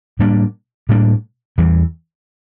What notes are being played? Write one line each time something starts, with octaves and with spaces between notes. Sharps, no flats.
A2 G3 A#3 D4
A2 G3 A#3 D4
E2 E3 G3